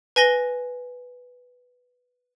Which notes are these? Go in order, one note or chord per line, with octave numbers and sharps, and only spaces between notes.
B4 G#5 A#6 G7